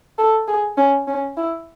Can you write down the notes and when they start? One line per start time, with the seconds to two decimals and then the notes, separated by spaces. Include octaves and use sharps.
0.18 A4
0.48 G#4
0.78 C#4
1.08 C#4
1.37 E4